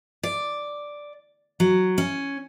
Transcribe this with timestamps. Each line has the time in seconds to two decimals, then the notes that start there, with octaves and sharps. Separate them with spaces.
0.23 D5
1.60 F#3
1.98 C#4